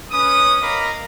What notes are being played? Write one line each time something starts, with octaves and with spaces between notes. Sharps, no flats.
C#4 B4 D#6
A#4 D#5 F5 A#5 B5 D6